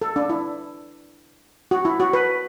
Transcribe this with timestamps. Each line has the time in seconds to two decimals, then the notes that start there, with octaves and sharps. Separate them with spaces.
0.02 A4
0.16 D4
0.29 E4
1.71 F#4
1.85 E4
2.00 F#4
2.13 B4